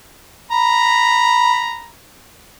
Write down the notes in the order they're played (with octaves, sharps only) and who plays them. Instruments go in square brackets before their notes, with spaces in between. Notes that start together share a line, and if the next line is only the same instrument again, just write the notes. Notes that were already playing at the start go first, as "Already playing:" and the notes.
[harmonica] A#5 B5